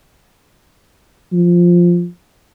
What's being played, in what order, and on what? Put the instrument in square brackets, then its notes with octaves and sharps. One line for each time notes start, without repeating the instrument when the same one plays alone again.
[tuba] F3